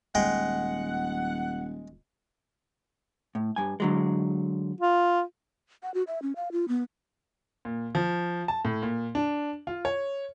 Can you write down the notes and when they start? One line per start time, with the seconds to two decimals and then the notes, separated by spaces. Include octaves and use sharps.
0.15 D#1 G#3 F#5 G5
3.35 A2
3.56 G2 G#5
3.80 D3 F#3 G#3
4.81 F4
5.83 F#5
5.94 F#4
6.07 E5
6.22 C#4
6.36 F5
6.52 F4
6.68 B3
7.65 A#2
7.95 F3
8.48 A5
8.65 A2
8.83 A#2
9.15 D4
9.67 F4
9.85 C#5